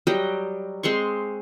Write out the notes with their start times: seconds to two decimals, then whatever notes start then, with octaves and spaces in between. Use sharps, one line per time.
0.07 F#3 G3 D#5 G5
0.83 G#3 C4 C6 C#6